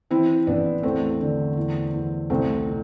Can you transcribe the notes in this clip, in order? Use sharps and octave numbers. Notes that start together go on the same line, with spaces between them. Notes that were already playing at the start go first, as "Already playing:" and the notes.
E3 C4 E4
A1 B3 D4
E2 A3 C4
D3
E2
E2
C2 A3 C4
B2